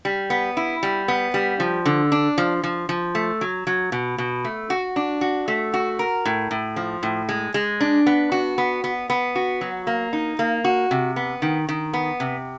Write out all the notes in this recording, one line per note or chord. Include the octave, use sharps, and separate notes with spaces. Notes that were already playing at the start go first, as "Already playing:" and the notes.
G3
B3
E4
G3
B3
G3
F3
D3
D4
F3
F3
F3
A3
F#3
F#3
B2
B2
A3
F#4
D4
F#4
A3
F#4
A#4
A2
A2
F3
A2
G#3
G#3
D4
B3
F#4
B3
B3
B3
F#4
F#3
A#3
D#4
A#3
F#4
C3
B3
D#3
D#3
B3
C3